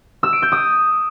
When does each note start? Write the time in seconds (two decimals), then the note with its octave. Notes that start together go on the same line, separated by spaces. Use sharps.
0.23 E6
0.33 D7
0.42 G6
0.52 D#6